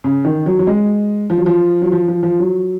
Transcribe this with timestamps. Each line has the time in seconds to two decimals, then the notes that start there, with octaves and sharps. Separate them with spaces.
0.04 C#3
0.25 D#3
0.46 F#3
0.59 F#3
0.67 G#3
1.30 F3
1.38 F#3
1.46 F3
1.82 F#3
1.92 F3
2.08 F3
2.23 F3
2.40 F#3